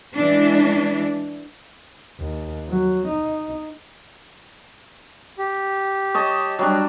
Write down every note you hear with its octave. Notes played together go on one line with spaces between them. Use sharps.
E3 G#3 D4
D#2
F#3
D#4
G4
C#5 D#5 A5
F#3 G3 D4